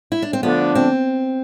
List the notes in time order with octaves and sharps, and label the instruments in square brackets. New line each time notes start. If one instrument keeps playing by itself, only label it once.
[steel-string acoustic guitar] E4
D4
C4
[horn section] D3 F3 A3 D4 [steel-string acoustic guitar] B3
[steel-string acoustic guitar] C4